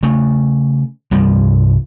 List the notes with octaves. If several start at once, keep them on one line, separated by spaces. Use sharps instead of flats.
C#3 A3
C2 G2 F3 G3